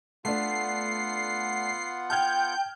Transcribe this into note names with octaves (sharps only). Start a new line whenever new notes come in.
A3 B3 D4 F4 F#5 C7
G5 A5 F6 G6 G#6